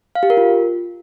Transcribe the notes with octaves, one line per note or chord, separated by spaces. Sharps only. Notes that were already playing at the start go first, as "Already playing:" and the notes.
F5
G4
A#4
F4